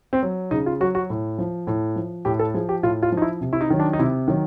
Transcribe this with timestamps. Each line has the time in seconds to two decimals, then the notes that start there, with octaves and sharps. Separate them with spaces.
0.13 C4
0.23 F#3
0.51 C#3 D#4
0.66 F4
0.80 F#3 F#4
0.95 F#4
1.10 A2
1.39 F3
1.67 A2
1.96 F3
2.25 A2 G4
2.39 A4
2.54 F3 G#4
2.69 G4
2.83 A2 F4
3.03 F4
3.12 F3
3.17 D#4
3.22 E4
3.41 C3
3.53 E4
3.61 D#4
3.70 D#3 F#3
3.80 D4
3.93 D#4
3.99 C3 E4
4.28 D#3 F#3